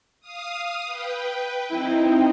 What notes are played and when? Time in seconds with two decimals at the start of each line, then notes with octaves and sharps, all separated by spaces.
0.20 F5 D#6
0.85 B4 G5
1.70 C4 D#4 E4 G5